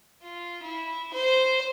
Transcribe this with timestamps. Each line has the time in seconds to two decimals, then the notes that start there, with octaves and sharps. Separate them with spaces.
0.22 F4
0.62 E4
1.13 C5